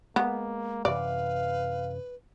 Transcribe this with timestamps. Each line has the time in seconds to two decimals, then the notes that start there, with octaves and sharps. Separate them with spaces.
0.16 G#3 A#3 B3
0.85 F#2 C3 E3 B4 D5 F5